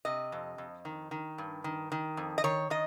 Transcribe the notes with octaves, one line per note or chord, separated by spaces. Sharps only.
C3 D#5
F2
F2
D#3
D#3
G2
D#3
D#3
F2
D#5
D#3 C#5
D#3 D#5